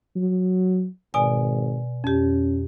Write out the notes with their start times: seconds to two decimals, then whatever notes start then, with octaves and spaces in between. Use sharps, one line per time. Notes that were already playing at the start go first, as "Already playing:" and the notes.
0.16 F#3
1.14 G#1 B2 D5 G#5
2.04 F2 C#4 G4